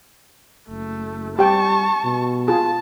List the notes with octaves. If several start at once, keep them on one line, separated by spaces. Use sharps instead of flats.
F#1 A3
G3 G4 G5 A5 C#6
B2
F4 G#4 A5